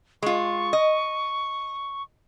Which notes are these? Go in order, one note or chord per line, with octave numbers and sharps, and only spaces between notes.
G#3 F4 C#6
D#5